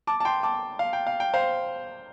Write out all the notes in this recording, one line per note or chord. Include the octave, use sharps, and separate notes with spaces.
A5 D6
A5
G5 C6
A5 D6
F5
G5
F5
G5
C5 F5